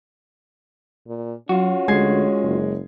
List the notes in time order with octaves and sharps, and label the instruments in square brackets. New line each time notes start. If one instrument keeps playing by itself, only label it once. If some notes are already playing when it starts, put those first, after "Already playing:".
[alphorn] A#2
[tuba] F#3 [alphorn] C#4 [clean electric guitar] F4 F#4
[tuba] D2 [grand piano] G#3 G#6 C7
[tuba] F#1